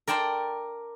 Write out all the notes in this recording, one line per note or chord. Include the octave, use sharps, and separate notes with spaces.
A#4 D5 G5 A5 C6